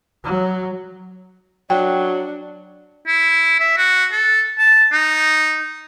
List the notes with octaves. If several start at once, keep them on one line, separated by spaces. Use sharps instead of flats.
F#3
F#3 D4 G5
E4
E5
F#4
A4
A5
D#4